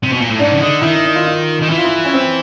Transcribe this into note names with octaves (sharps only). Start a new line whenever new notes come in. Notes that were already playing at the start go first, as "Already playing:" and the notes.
C3
B2
A#2
A2
G#2 D4
C#3
D3 D#4
D#3 E4
D#4
D#4
F4
F4
D#3
E3 E4
F4
E4
C#4
C4